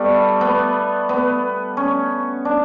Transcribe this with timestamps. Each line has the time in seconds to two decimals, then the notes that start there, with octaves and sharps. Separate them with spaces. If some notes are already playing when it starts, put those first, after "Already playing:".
Already playing: G3 A3 B3
0.41 B3
1.09 B3
1.77 C#4
2.45 D4